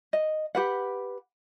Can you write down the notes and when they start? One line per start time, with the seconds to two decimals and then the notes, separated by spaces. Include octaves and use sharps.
0.13 D#5
0.55 G4 B4 F#5